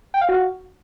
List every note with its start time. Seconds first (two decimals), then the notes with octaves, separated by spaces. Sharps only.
0.14 G5
0.21 F5
0.29 F#4